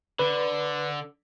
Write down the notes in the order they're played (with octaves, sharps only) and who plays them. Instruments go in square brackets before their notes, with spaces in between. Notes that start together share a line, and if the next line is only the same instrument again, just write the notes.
[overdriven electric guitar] D3 [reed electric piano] B4